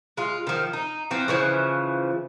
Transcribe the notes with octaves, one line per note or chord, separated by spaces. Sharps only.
G#3 F4
D#3 F3
D#4
E3 F3 C4
C#3 E3 F3